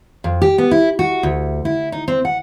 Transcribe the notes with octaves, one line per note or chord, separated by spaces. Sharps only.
F2
G4
B3
E4
F#4
D2
E4
D#4
C4
F#5